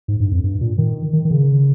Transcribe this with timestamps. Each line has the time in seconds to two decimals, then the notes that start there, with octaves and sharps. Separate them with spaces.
0.08 G#2
0.20 G2
0.31 F2
0.44 G2
0.61 A#2
0.78 D#3
1.13 D#3
1.25 D#3
1.31 C#3